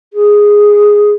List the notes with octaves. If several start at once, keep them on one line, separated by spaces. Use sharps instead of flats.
G#4